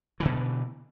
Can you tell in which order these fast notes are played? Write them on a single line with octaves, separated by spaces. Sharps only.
E3 D3 B2